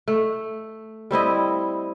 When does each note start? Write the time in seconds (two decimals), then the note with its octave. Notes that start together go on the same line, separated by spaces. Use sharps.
0.08 A3
1.11 G3 C4 E4 D#5